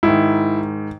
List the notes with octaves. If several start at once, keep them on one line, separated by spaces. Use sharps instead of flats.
G#2 D#3 E4